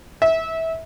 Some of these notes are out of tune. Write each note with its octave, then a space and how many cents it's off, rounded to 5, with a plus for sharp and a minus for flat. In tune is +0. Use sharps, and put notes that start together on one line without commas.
E5 -20